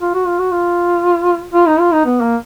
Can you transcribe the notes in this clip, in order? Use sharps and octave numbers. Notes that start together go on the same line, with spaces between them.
F4
F#4
F4
F#4
F4
F4
D#4
F4
D#4
B3
A#3